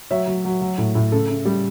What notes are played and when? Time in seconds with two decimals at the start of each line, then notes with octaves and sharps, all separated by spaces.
0.11 F#3 C#5 E5
0.27 F#3
0.45 F#3
0.61 F#3
0.78 A2
0.95 A2
1.12 C#3 A4
1.29 C#3
1.45 G3